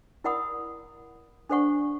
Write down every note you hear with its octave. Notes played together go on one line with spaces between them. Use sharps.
E4 A#4 D5 F#5 B5 D#6
D4 A4 C5 D5 F#5 C#6